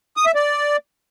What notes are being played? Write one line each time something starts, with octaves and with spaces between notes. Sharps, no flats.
D#6
E5
D5